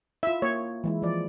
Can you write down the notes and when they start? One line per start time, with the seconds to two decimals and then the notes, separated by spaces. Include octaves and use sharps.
0.23 E4 F4 E5
0.42 A#3 C#5
0.84 E3 G#3 E4
1.02 F3 D5